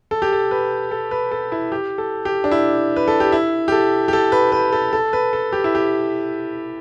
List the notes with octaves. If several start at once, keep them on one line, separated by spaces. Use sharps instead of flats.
A4
G4
A4
B4
A4
B4
A4
E4
G4
A4
G4
D4
E4
B4
A4
G4
E4
G4
A4
G4
A4
B4
B4
A4
A4
B4
A4
G4
E4
G4